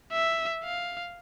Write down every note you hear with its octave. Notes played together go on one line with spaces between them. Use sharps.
E5
F5